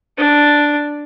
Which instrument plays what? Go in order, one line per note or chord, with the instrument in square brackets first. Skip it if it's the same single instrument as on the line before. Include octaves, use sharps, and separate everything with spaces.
[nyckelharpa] D4